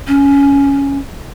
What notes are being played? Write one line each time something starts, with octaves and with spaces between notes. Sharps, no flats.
C#4